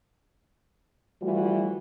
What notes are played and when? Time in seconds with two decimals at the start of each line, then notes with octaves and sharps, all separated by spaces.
1.22 E3 F3 G3 A3 F4 F#4